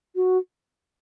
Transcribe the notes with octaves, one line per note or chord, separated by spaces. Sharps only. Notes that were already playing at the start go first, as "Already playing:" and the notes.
F#4